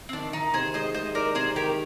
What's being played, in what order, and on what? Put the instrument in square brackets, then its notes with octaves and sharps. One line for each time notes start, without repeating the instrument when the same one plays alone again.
[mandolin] C4
[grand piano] D#3 [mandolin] D4
[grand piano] D#3 [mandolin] D#4
[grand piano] C3 [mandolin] G#4 C5
[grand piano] G#3 [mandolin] C5 D#5
[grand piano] G#3 [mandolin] C5 D#5
[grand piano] D#4 [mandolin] A#4 D5
[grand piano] C3 [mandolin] G#4 C5
[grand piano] D#3 [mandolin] G4 A#4